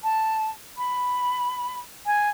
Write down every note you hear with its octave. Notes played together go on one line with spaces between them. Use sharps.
A5
B5
G#5